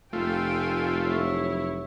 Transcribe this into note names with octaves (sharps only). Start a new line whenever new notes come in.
F1 A3 F4 G5 G#5
F#3 E4 C#5